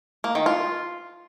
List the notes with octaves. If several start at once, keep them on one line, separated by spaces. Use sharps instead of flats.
A#3
D#3
F4